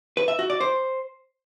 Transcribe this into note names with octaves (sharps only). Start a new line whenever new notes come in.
B4
E5
F#4
D5
C5